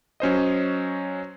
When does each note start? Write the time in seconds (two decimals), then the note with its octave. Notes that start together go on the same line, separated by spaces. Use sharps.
0.20 F#3 C#4 C5 D#5